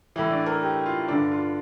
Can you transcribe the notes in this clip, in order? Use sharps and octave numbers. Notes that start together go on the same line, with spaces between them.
A2 E3 E4
D4
A#4
G4
F4
G2 D3 D4
F4